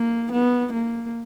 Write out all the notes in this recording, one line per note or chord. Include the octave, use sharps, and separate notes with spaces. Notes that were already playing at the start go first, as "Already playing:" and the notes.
Already playing: A#3
B3
A#3